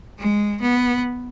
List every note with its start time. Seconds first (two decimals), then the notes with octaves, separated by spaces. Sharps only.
0.19 G#3
0.61 B3